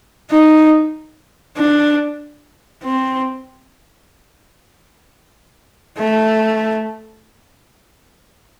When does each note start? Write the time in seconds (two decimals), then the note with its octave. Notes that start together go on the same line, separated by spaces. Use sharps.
0.31 D#4
1.57 D4
2.83 C4
5.98 A3